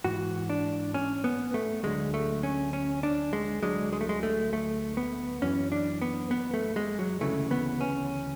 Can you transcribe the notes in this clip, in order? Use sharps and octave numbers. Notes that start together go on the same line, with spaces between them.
G#2 E3 F#4
D4
C#4
B3
A3
D2 D3 F#3 G#3
A3
C#4
C#4
D4
G#3
D2 D3 F#3 G#3
G#3
A3
G#3
A3
A3
B3
F#2 E3 C#4
D4
B3
B3
A3
G#3
F#3
D2 C#3 E3 A3
B3
C#4